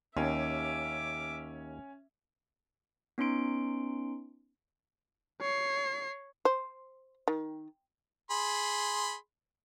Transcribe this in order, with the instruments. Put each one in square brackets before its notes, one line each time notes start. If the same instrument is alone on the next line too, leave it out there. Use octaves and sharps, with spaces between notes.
[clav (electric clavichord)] D#2 [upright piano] C#4 [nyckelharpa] E5 D6
[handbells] B3 C#4 D#4 C6 D7
[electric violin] C#5 C7
[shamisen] C5
D#3
[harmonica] G#4 B5 C6